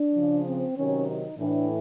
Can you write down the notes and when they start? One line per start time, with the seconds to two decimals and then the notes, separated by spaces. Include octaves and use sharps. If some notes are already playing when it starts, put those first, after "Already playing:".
Already playing: D4
0.15 C#3 F3
0.45 C4
0.76 C3 D#3 F#3 C#4
1.07 D#4
1.38 A2 E3 D4